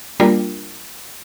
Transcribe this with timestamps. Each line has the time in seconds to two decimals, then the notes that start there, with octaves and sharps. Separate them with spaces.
0.20 G3 A#3 D4 F4 A#4